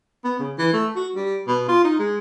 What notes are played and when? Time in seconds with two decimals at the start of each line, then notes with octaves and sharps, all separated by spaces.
0.24 B3
0.39 C#3
0.58 E3
0.73 A3
0.96 F#4
1.15 G3
1.47 B2
1.68 F4
1.84 D#4
1.99 G#3